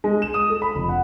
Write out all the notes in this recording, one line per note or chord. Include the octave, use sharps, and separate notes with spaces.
G#3
E7
D#6
A4
B5
F1
F#5